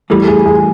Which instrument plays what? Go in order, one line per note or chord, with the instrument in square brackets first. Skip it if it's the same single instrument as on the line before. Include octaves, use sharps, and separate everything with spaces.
[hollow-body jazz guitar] A2 E3 G3 [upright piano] A4
[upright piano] G#4
G#4